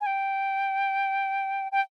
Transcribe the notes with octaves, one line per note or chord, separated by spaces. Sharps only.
G#5
G5
G5